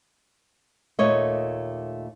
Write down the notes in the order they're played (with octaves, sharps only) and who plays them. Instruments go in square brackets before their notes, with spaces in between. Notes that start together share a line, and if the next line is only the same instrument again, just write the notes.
[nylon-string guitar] D#2 A#2 A3 C#5 D#5